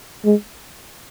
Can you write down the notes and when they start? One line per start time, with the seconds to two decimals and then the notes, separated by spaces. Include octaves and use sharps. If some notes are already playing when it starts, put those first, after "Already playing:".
0.25 G#3